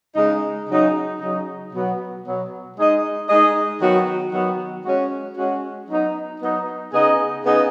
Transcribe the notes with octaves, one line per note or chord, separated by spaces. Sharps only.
C#3 G#3 D#4
C#3 F#3 D#4
C#3 F#3 D#4
B2 F#3 B3
B2 F#3 B3
G#3 D#4 G#4 D#5
G#3 D#4 G#4 D#5
D#3 F#3 B3 F#4
D#3 F#3 B3 F#4
G#3 C#4 F#4
G#3 C#4 F#4
F#3 B3 D#4
F#3 B3 D#4
C#3 B3 D#4 G#4 D#5
C#3 B3 D#4 G#4 D#5